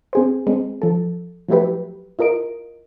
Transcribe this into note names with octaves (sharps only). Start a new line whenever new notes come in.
C4 G#4 C5
G#3 C4
F3 A4
F3 F#3 A3 E4 G4 B4
E4 F4 A#4 D#5 D7